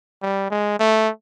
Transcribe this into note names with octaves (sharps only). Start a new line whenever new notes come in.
G3
G#3
A3